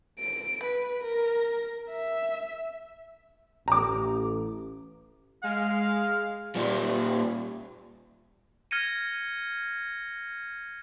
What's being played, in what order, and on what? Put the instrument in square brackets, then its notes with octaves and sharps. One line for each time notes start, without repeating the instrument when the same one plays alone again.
[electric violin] D7
B4
A#4
E5
[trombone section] A1 [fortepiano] A#5 D6
[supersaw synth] G#3 [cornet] F5
[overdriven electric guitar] A#2 G3
[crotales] F6 G#6 A#6 C#7 D#7